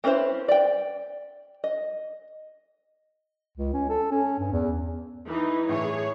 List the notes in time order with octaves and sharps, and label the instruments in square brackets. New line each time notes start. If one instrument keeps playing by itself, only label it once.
[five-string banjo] C4 C#4 E4 B4 C5
D5 G5
D#5
[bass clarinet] C#2
C#4
A4
C#4
G2
E2
[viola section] E3 D#4
[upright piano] A2 E3 A3 [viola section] G#4 C#5